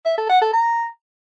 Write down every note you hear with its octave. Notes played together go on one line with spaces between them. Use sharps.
E5
A4
F#5
A4
A#5